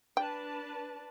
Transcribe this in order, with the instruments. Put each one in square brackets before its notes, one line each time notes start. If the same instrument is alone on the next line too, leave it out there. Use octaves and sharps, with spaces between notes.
[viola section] D4 B4 A5 [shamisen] G5